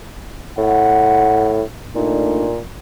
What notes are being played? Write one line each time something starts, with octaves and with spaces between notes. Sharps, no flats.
A2 F#5
A#2 A3 D4 D#4